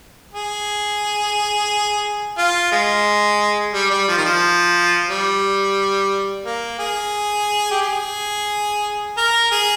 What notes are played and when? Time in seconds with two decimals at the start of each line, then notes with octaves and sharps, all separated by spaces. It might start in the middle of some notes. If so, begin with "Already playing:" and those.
0.34 G#4
2.38 F4
2.72 G#3
3.73 G3
3.90 G3
4.08 F3
4.18 D#3
4.25 F3
5.09 G3
6.45 A#3
6.79 G#4
7.71 G4
7.81 G#4
9.17 A#4
9.51 G#4